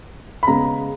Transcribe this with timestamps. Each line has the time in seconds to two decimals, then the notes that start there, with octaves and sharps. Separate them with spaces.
0.43 B5
0.47 C#3 G#3 B3 A#5